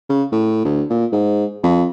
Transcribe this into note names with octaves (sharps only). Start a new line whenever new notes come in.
C#3
A2
D2
A#2
G#2
F2